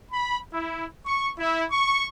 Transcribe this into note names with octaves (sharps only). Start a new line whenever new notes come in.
B5
E4
C#6
E4
C#6